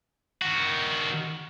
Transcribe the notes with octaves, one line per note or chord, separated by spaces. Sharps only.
D#3 F#4